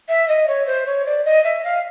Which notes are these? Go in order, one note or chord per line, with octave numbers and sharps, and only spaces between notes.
E5
D#5
C#5
C5
C#5
D5
D#5
E5
F5